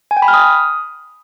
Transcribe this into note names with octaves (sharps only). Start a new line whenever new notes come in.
G#5
G5
B5
F6
D#6